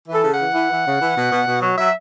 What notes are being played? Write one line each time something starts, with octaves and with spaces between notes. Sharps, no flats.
E3 A4
C#3
E3 F#5
E3
E3
C#3
E3
B2
B2
B2
F#3
F#3 E5